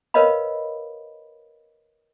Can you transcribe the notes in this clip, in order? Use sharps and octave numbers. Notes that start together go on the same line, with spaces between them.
A#4 B4 C#5 D#5 F5 B5